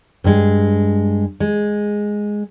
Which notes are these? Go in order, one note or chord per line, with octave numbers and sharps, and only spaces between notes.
G2 G#3
G#3